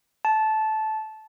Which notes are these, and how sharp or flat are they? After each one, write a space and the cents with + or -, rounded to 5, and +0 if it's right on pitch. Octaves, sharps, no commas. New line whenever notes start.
A5 -15